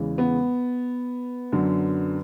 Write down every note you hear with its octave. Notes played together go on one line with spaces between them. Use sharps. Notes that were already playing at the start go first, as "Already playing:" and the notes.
Already playing: E2 C#3 E3 G#3
B3
F#2 D3 F#3